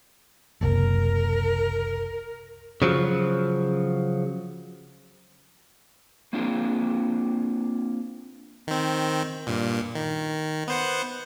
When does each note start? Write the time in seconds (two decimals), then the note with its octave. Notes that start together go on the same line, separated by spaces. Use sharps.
0.61 F#1 C2 A#4
2.82 C#3 F3 F#3
6.33 A#3 C4 D4 F4 G#4
8.67 D#3 C4
9.47 G2 A#2
9.95 D#3
10.68 B3 C5 F#5